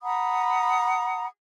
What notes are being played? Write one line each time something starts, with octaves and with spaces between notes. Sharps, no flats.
F#5 A#5 B5 D#6